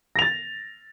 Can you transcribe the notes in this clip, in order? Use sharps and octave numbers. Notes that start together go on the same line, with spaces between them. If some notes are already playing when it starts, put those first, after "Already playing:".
A6 A#6 F7